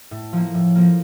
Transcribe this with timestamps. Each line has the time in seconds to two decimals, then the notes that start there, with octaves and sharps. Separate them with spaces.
0.11 A2
0.33 F3 A#3
0.54 A2
0.75 F3 A#3